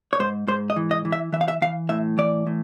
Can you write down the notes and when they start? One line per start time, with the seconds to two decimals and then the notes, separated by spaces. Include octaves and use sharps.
0.13 C#5
0.19 G#2 C5
0.47 G#2 C5
0.70 D#5
0.76 E3
0.91 D#5
1.05 E3
1.12 E5
1.33 E3 E5
1.41 F5
1.48 E5
1.62 E3 F5
1.89 A2 E5
2.18 E3 D5
2.47 A2